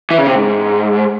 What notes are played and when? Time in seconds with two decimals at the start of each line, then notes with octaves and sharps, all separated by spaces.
0.11 E3
0.18 C#3
0.27 C3
0.35 G#2